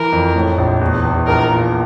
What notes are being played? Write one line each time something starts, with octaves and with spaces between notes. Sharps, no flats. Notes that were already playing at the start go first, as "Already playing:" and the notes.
Already playing: E3 A#4
F2
A2
A#1
E2
E2
A#1 A#4
A#2